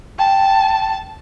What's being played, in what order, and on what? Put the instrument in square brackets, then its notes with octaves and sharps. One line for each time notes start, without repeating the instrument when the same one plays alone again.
[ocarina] G5 [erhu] A5